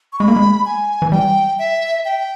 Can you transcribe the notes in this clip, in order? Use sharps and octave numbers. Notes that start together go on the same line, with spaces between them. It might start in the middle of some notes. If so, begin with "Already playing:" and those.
C#6
G#3 B5
A#3
G#3
G#5
E3
G3 G5
E5
G5